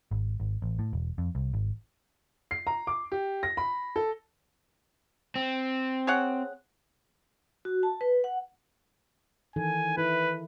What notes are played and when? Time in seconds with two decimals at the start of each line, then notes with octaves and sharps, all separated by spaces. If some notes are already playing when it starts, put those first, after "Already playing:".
0.11 G#1
0.40 G#1
0.62 A1
0.79 A2
0.93 E1
1.18 F2
1.35 C2
1.53 G#1
2.51 C7
2.67 A#5
2.87 D6
3.12 G4
3.43 A#6
3.57 B5
3.96 A4
5.36 C4
6.07 G#4 C#5 F#5
7.65 F#4
7.83 A5
8.01 B4
8.24 F#5
9.56 D#3 E3 A4 G#5
9.98 E4 B4